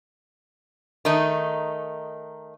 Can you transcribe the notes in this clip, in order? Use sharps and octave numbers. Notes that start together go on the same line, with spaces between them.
D#3 A3 D#4